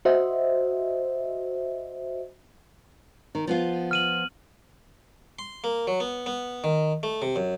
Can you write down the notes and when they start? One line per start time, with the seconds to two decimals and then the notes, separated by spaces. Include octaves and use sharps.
0.05 F#4 C5 D#5 E5
3.35 D#3
3.47 F3 B3 F4
3.91 F6 D#7 F#7
5.39 C6
5.64 A#3
5.87 F#3
6.00 B3
6.26 B3
6.64 D#3
7.03 A3
7.22 C3
7.36 F#2